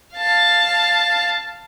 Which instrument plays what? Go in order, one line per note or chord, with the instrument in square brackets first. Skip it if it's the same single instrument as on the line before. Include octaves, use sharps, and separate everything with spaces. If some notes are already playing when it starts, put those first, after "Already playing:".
[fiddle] F5 A5